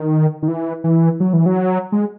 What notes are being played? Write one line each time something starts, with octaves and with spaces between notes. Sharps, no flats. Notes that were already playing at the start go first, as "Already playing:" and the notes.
Already playing: D#3
D#3
E3
E3
F#3
E3
F#3
G#3